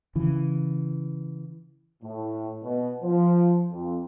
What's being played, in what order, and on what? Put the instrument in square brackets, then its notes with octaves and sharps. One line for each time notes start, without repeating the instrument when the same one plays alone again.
[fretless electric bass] C#3 E3
[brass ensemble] A2
B2
F3
F2